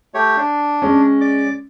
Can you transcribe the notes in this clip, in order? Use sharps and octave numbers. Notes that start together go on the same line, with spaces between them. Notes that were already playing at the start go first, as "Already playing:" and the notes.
A3 G4 C#5
D4
G#3 C#4
D5 D6